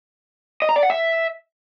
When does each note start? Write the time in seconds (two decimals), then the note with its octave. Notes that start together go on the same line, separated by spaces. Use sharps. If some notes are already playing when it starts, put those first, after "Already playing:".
0.62 D#5
0.69 A#5
0.76 D5
0.83 F#5
0.90 E5